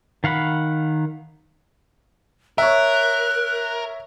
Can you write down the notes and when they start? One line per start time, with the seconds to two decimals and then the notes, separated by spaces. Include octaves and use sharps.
0.24 D#3 F5 F#5 B5
2.58 A#4 C#5 E5 F#6